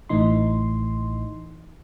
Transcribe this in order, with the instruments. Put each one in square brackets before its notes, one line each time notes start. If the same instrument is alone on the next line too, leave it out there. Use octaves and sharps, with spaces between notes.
[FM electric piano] A1 A2 E3 D#4 C6